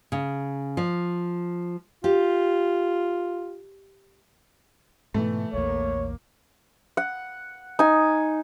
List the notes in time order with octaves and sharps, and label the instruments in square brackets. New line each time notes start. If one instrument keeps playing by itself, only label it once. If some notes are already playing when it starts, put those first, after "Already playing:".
[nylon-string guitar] C#3
F3
[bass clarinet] F4 [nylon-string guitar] G4
[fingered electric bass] G#2 B2 [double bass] E3 [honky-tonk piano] A3
[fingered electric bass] A#1 E2 [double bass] A#3 [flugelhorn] C#5
[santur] F#5
D#4 G#5